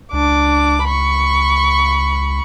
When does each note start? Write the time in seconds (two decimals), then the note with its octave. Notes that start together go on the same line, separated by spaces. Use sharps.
0.13 C#2 D4 D6
0.84 B5 C#6